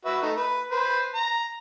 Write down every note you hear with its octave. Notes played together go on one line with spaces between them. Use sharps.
F#4 B4 E5
A3 D#4 A4
B4
B4 C5
A#5